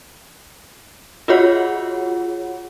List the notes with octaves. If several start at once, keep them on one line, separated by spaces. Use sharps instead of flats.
F4 F#4 G#4 C#5 F#5